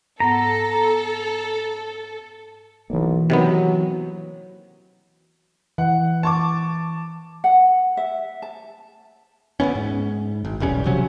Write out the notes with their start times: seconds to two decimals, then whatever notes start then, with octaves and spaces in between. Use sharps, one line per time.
0.20 G#2 B3 A4 F#5 A#5
2.90 B1 E3 A#3
3.30 C3 D#3 F#3 B3
5.78 E3 F#5
6.23 A5 C#6 D6
7.44 F#5
7.97 E5
8.42 A5
9.60 D2 A3 B3 C#4
9.75 G#2
10.45 G#1
10.60 E1 B1 G3 C#4
10.86 C3 F3 F#3 C#4